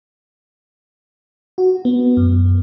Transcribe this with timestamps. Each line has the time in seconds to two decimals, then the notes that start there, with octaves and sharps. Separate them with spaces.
1.58 F#4
1.85 B3
2.17 F#2